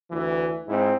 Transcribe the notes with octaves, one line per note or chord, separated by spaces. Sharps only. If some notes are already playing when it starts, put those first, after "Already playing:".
D2 E3
G#2 C4 E4